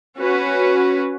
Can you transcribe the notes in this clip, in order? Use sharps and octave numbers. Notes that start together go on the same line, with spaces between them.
C#4 F#4 B4